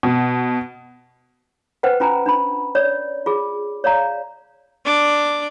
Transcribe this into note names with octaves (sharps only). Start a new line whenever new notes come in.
B2
B4 C5 F#5 G5
C#4 F4 G#5 A#5
D4 B5
C#5 D5
F4 G#4
C#5 D5 F5 A#5
D4 D6